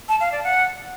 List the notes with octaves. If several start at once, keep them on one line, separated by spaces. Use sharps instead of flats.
A5
F5
D5
F#5